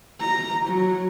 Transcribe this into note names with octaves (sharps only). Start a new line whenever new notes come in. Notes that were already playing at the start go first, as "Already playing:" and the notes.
A#5
F#3